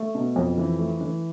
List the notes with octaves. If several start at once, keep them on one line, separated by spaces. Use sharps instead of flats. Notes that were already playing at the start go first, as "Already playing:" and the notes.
Already playing: A3
B2
F2
E3
A3
E3